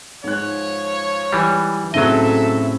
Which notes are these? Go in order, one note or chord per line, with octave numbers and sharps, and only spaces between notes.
G#2 F3 C#5 F#6
E3 G3
A2 C#3 F#3 C4 A4 D#5 E5